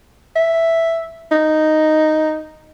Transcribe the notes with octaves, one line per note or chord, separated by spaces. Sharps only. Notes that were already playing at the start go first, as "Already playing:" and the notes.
E5
D#4